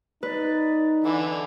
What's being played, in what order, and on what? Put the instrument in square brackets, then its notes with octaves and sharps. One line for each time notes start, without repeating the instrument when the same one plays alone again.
[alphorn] D#4 [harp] B4 [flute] D5
[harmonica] D3 E3 [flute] B5